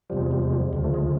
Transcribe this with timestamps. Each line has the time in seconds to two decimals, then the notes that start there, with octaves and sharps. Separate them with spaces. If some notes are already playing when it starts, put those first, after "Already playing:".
0.10 E2 C3 F3 G3
0.21 G#3
0.31 G3
0.42 G#3
0.54 G3
0.73 D2 C#3 F3 G3
0.84 A3
0.94 G#3